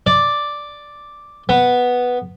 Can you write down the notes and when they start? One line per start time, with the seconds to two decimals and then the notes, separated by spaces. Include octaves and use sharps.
0.07 D5
1.49 B3